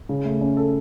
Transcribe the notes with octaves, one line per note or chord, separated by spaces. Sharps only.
C#3
A3
C#4
A4